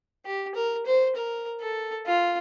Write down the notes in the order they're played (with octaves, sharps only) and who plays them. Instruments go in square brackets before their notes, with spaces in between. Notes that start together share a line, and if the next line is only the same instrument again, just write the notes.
[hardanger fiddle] G4
A#4
C5
A#4
A4
F4